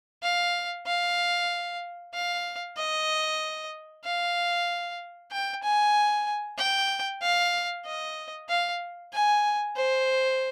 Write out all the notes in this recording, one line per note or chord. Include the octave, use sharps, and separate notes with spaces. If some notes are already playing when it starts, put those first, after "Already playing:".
F5
F5
F5
D#5
F5
G5
G#5
G5
F5
D#5
F5
G#5
C5